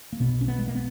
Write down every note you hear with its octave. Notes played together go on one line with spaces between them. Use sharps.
A#3
B1 B2 B3
C#4
B3
G#3
A#3
B3